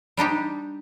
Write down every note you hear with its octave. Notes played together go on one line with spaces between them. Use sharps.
G3 D4 D#4 G4